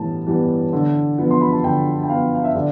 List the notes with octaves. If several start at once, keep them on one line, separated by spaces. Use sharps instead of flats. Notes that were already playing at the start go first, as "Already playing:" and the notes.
Already playing: A2 E3 G3 B3 A5
E3 G3 B3
D3
F3 B3
C6
B5
A5
D3 G5
G5
F3 B3 F5
F5
E5
D3 D5